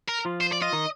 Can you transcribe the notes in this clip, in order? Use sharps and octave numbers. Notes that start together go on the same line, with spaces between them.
A#4
F3 F4
C5
D5
F4 D#5
D#3 D#4